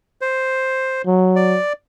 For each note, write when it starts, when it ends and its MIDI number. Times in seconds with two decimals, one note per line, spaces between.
0.21 1.02 72
1.06 1.58 54
1.36 1.73 74